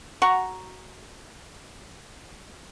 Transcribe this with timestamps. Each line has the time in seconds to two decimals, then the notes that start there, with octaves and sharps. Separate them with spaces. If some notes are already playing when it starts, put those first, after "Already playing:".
0.22 F#4 F#5 A#5 C#6